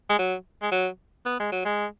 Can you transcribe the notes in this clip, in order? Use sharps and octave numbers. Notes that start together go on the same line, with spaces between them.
G#3
F#3
G#3
F#3
B3
G#3
F#3
G#3